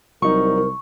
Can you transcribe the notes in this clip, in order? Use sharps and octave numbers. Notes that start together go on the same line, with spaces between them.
C2 F#3 D#4 A#4 C#6